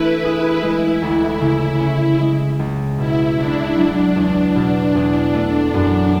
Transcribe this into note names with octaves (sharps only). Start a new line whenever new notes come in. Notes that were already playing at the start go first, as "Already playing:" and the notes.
Already playing: E3 A3 D4 E4 B4
G#4
G#3
D2
C#3
C#4
G#3
C#2
B2 E4
C#2 D4
F#3 D4
E2
B2
E2
A3
F#2